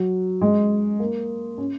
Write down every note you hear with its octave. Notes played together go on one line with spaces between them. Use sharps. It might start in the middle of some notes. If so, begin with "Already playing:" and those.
Already playing: F#3
G#3
A#3
C#4